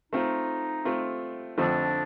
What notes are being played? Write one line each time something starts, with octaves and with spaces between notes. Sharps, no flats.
A3 C4 D#4 F4
A3 C4 F4
F2 D3 F3 A3 C4 D4